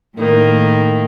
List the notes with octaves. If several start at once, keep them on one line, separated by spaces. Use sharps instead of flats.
A2 D#3 A#3